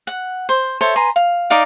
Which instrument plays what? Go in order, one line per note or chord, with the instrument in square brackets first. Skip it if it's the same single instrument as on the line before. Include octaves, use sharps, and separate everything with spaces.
[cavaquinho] F#5
C5
A4 C5 C#5 E5
B4 G#5 A#5 C6
F5
D#4 D5 F5 D6